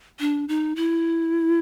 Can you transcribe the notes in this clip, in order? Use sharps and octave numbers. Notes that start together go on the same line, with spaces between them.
D4
D#4
E4